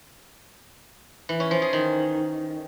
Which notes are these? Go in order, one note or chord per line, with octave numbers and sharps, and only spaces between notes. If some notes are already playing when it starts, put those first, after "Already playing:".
E3
C#4
F3
G#4
D#3